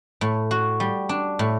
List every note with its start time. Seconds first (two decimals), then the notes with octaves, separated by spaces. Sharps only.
0.21 A2
0.51 F#4
0.80 G3
1.09 D4
1.39 A2